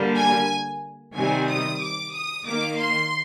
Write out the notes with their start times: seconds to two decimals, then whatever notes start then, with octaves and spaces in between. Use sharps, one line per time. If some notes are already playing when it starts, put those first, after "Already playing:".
Already playing: D3 G3 A#3
0.17 G#5
1.15 C3 D#3 G3 C4 G#5
1.48 D#6
1.81 D6
2.14 D#6
2.45 D#3 A#3 D6
2.79 C6